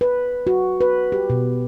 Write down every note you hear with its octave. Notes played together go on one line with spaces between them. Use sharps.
B4
F#4
B4
G4
B2